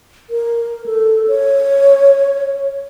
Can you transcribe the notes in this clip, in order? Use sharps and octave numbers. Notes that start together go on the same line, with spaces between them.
A#4
A4
C#5